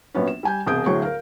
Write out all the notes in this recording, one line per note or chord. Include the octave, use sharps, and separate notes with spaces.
A#1 F#3 B3 C#4
E7
G3 G#5 G6
E1 C2 G#4 D#6 G6 D7
D2 A2 F#3 G#4 C#6
A#4 F5